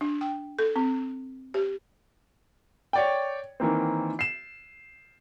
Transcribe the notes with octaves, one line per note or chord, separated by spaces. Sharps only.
D4
G5
A4
C4
G4
C#5 D5 G5
D#3 E3 A#3 C4
C7 E7